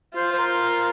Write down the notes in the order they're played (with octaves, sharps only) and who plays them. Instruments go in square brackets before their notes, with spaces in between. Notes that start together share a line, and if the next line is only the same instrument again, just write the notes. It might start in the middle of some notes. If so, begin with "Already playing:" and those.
[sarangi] F4 [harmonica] C5
[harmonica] C5
A#4